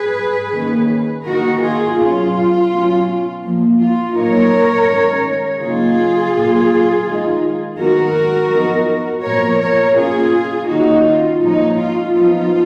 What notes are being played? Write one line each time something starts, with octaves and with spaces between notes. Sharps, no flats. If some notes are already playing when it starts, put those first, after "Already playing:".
Already playing: G#4 B4
D#3 A#3 C#4
D#3 A#3 D#4 F#4 A#4
F4 G#4
B2 F#3 C#4 F4
B2 F#3 C#4
A#2 F3 A#3
F4
A#2 F#3 A#3 D#4 A#4 C#5
D#3 G#3 C#4
C#3 F#3 A#3 D#4 F4 G#4
A#2 F#3 A#3
D#3 G#3 D#4
D#3 G#3 B3 D#4 F#4 A#4
F3 B3 D#4
A#2 F3 B3 A#4 C#5
A#4 C#5
B2 A#3 C#4 F4 G#4
D#3 A#3 C#4 D#4 F#4
F4
A#2 F3 G#3 C#4 D#4
F4
F3 B3 D#4 F4